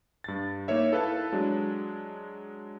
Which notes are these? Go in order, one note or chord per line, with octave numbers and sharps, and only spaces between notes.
G2 A6
A#3 D#4 A#4 C#5 E5
E4 A4 B4 F5 A5
F#3 G#3 D4